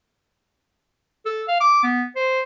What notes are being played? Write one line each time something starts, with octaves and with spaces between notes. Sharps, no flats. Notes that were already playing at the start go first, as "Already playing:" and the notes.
A4
F5
D6
B3
C5